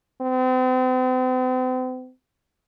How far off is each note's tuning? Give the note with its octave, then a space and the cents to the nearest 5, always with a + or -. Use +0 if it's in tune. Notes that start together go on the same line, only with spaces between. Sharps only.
C4 -40